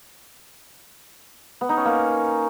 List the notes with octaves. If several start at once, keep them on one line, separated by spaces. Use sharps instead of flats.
B3
D#4
C#4
A#3